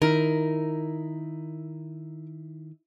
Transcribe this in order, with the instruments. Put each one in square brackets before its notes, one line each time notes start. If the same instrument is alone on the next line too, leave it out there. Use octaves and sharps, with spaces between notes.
[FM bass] D#3 [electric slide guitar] D#4 E4 [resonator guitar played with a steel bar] A#4